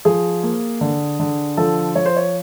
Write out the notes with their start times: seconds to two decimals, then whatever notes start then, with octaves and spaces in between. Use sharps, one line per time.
0.05 F3 G#4
0.43 A#3
0.81 D3
1.19 D3
1.57 F3 A4
1.96 F3 C#5
2.06 C5
2.17 C#5